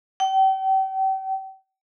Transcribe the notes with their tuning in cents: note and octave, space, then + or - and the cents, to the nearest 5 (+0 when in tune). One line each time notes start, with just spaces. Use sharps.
G5 -35